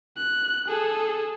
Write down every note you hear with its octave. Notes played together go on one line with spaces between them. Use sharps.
F#6
G#4 A4